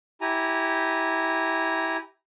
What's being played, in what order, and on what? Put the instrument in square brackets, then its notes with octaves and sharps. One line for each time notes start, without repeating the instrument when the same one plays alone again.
[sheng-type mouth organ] E4 G4 G#5 A#5